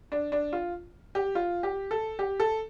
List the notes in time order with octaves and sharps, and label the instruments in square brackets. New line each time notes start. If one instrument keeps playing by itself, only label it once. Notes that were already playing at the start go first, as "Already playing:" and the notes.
[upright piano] D4
D4
F4
G4
F4
G4
A4
G4
A4